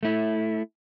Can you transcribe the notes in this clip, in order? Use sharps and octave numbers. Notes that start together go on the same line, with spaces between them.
A3 E4